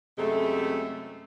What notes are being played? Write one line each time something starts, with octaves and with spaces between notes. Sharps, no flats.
F#2 C3 G#3 A3